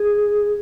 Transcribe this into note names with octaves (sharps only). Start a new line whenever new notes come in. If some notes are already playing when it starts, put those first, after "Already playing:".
Already playing: G#4